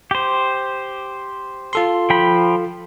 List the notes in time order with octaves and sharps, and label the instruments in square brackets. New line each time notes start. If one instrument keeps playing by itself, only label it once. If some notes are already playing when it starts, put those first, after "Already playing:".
[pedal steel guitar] G4 C5
[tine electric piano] F4 A4 C6
[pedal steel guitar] F3 G5 B5